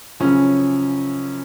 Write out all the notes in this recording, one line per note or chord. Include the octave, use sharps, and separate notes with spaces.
F#2 C#3 F3 C#4